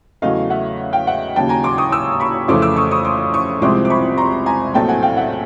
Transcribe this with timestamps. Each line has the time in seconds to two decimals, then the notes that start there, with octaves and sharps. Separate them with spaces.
0.22 E2 C#3 F#3 A3 C#4 D#5 F5
0.50 E5 F#5
0.93 F5 G5
1.07 E5 F#5
1.36 D#2 C#3 F#3 G5 A5
1.49 G#5 A#5
1.64 C6 D6
1.78 C#6 D#6
1.92 D6 E6
2.20 B5 C#6
2.48 F2 C#3 E3 A3 C#4 C6 D6
2.62 D6 E6
2.76 C#6 D#6
2.91 C#6 D#6
3.05 C6 D6
3.34 C#6 D#6
3.61 C2 C3 F3 G#3 C4 C6 D6
3.85 D6
3.90 B5 C#6
4.18 A#5 C6
4.46 G#5 A#5
4.74 A#1 A2 F#3 A3 C4 G5 A5
4.88 F#5 G#5
5.03 F5 G5
5.17 E5 F#5